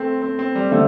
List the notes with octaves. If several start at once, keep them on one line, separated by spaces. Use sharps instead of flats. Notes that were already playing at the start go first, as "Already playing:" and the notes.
Already playing: A3 C4
C4
C4
G3
D3 G3 A3 C4